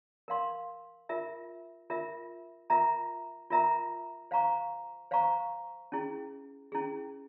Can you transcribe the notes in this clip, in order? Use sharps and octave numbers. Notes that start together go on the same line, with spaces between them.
A#4 F5 C6
F4 A#4 E5
F4 A#4 E5
F4 A#4 E5 A#5
F4 A#4 E5 A#5
C5 F5 A#5 C#6
C5 F5 A#5 C#6
C#4 E4 G#4
C#4 E4 G#4